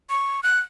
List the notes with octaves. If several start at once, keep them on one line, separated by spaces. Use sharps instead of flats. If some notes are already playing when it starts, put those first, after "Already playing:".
C#6
F#6